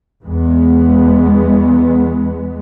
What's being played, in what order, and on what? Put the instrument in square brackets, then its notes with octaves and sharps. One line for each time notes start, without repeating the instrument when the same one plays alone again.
[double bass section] E2 G#3 B3